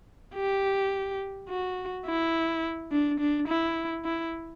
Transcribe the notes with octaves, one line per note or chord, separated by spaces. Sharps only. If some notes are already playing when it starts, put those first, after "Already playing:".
G4
F#4
E4
D4
D4
E4
E4